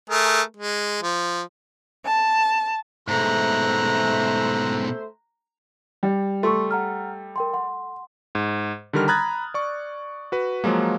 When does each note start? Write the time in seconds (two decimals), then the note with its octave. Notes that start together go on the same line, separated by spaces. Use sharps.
0.10 A3 G#4 A#4
0.57 G#3
1.02 F3
2.05 A5
3.08 G#2 B2 A3 C5 E5 A#5 F#6
6.03 G3
6.43 A3 C6 C#6
6.71 F#5 A#5 F6
7.36 A#4 G5 C6
7.53 F#5 C6
8.35 G#2
8.93 D3 D#3 G3 A#4 F6
9.08 A#5 B5 D#6 F#6 G#6 A6
9.54 D5 C#6
10.32 F#4 B4
10.64 F3 F#3 G#3 A#3